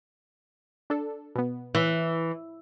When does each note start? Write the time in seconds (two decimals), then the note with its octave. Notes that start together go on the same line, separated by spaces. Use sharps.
0.90 D4 A4
1.36 B2 B3
1.75 E3